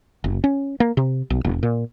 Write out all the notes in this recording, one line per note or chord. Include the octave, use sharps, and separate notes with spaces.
F#1
C#4
A#3
C3
B1
E1
A#2